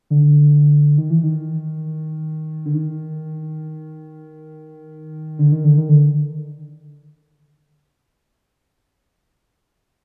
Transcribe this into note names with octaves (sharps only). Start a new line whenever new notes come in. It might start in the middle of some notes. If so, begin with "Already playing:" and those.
D3
D#3
E3
D#3
D3
D#3
D3
D#3
D3
D#3
D3